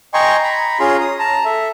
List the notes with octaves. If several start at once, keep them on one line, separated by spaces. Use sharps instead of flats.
D#5 G5 G#5 A#5 C6 C#6
A#5 B5
C#4 F4 G#4 A#5 C6
D#6
A5 A#5
A4 E5